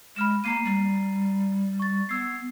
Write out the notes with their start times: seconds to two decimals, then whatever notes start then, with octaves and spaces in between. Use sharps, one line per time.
0.16 G#3 B5 F6 E7
0.44 A#3 A#5 C7 D#7
0.65 G3
1.80 C#6 A6
2.09 B3 E6 G#6 C7